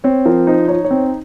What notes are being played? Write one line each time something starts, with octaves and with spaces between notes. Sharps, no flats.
C4 C#5
F3 A#4
D#4 C5
D#4 C#5
C#5
C4